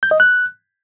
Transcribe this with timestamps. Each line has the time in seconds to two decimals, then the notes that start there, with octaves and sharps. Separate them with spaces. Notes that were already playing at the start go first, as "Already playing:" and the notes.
0.03 G6
0.11 D#5
0.20 F#6